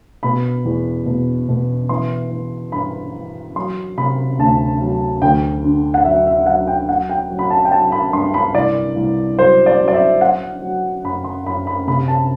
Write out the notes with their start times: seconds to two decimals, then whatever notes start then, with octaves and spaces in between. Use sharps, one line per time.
0.23 B2 B5
0.65 E2
1.06 B2
1.49 B2
1.89 E3 C6
2.31 E3
2.72 G2 B5
3.14 E3
3.56 F#3 C6
3.97 C3 B5
4.39 D2 A5
4.81 F#3
5.22 D2 G5
5.64 D3
5.94 F#5
6.05 F#3 E5
6.27 E5
6.46 F#3 F#5
6.67 G5
6.89 F#3 F#5
7.09 G5
7.31 F#3
7.39 B5
7.50 A5
7.65 G5
7.71 F#3 A5
7.92 B5
8.13 G2 C6
8.34 B5
8.55 C2 D5
8.96 C2
9.38 F#3 C5
9.66 D5
9.80 F#3
9.88 D5
9.94 E5
10.21 F#3 F#5
10.62 F#3
11.04 F#2 B5
11.24 C6
11.46 F#2 B5
11.67 B5
11.87 C3 B5
12.08 A5